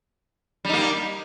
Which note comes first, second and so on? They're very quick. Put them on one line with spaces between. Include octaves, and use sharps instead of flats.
G3 D#4 A#3